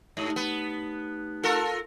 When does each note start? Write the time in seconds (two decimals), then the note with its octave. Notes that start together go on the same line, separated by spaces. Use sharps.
0.17 G#2 A3 D#4 G4
0.36 B3
1.43 F4 A4 A#4